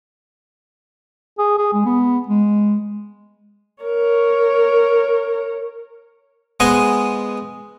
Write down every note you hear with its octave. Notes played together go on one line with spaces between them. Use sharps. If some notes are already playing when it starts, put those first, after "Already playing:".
G#4
G#4
G#3
B3
G#3
A#4 C#5
G#3 B3 C5 D#5 F#5 G#5